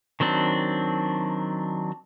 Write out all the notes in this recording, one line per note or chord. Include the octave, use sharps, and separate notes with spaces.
D#3 F#3 C4 D4